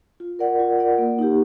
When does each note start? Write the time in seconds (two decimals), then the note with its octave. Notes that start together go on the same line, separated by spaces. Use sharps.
0.20 F4
0.39 A#4 D5 F#5
0.59 F4
0.79 A#4 D5 F#5
0.98 A#3
1.19 D#4 G4